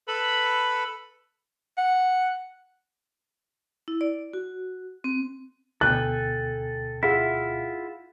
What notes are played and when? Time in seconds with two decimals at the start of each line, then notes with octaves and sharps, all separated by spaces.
0.08 A4 B4 B5
1.78 F#5
3.88 E4
4.01 D5
4.33 F#4
5.04 C4
5.81 D2 B2 A4 G5 G#5 F#6
7.03 E4 F4 G#4 E5 F#5 B6